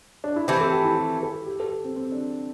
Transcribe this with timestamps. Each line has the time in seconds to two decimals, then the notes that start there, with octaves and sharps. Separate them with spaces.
0.24 D4
0.36 E4
0.48 E3 A3 C4 G4
0.61 A4
0.73 G4
0.85 E4
0.97 G4
1.23 A4
1.46 G4
1.60 A4
1.71 G4
1.84 C4
1.96 C4
2.12 D4